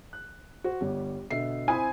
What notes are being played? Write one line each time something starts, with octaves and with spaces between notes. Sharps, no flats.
F#6
F#4 C5
G1 G3 C#5
B2 D3 E5 C7
C4 E4 C5 G#5 B5 D#6